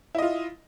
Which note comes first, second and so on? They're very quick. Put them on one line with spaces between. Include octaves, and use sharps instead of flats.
E4 D#5 F4